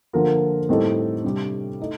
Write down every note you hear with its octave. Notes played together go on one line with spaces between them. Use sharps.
D3 F3 A#3 F4 A#4
A2 G3 C4 D#4 A4
C3 G3 D4
A3 D#4